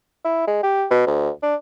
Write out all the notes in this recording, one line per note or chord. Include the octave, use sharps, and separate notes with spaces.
E4
G#3
G4
B2
D2
D4